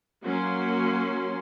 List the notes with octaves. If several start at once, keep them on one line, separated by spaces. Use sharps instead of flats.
F#3 A#3 C#4 C6